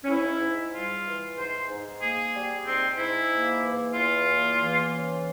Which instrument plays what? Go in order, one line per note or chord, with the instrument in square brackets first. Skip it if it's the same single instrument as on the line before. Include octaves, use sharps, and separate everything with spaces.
[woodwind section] C#4
G#2 E4
G#2
G3 F4
E3
G#2 C5
G#2
A#3 G#4
G3
G#2 C4
G#2 E4
A#3
E3
E2 F4
A#3
E3
C#3